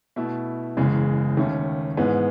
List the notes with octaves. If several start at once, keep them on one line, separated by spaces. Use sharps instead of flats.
B2 A3 E4
F#1 E2 C#3 G#3
D#2 D#3 A3 C#4
G#2 E3 G#3 B3